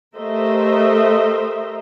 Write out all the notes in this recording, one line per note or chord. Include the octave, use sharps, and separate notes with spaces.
A3 G4 A#4 C5 D#5 E5